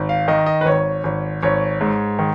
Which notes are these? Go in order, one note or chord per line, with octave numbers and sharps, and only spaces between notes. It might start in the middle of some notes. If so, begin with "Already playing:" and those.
Already playing: G#1
F5
D#3 D#5
D#5
B4
G#1 C#5
G#1
G#1 C#5
G#2
D#3